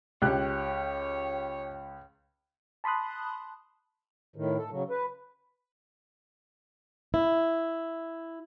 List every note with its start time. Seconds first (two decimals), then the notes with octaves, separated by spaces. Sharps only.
0.22 C#2 G4 C#5 F#6
2.84 A5 B5 C6 D#6 F#6
4.36 A2 D#3
4.57 A4
4.71 C#3 F#3
4.90 B4
7.14 E4